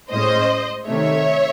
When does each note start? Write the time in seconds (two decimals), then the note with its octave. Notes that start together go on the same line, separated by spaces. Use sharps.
0.11 A2 G#3 C#4 C5 D#5
0.87 C3 D#3 A3 C#5 E5